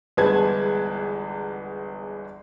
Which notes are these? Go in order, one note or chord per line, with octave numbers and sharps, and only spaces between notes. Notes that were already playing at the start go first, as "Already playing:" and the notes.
G1 E2 G#3 B4 A5 G#6